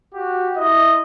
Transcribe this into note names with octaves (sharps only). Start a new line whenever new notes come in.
F#4 G4
E4 D#5